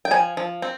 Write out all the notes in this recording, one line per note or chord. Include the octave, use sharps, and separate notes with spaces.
G5
F3 G#5
F3
C4